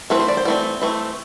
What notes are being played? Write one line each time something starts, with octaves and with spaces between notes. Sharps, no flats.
E3 A3 C4 B4
C5
D5
C5
E3 A3 C4 D5
E3 A3 C4